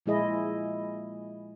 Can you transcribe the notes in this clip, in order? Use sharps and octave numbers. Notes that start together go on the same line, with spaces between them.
A#2 F3 G#3 E4 G#4 D#5